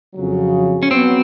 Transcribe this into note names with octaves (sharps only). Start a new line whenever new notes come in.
F2 C#3 F#3
C#4
F#3 B3 C4